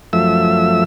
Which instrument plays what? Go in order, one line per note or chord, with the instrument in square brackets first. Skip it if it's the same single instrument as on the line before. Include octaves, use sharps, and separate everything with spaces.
[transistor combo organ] F#2 F3 A3 E5 E6